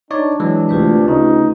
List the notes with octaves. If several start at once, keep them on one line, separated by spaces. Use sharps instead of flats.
D4 D#4 C#5 D5
E3 F#3 G#3
D2 C3 F4 G4 B4
D2 C#3 D#4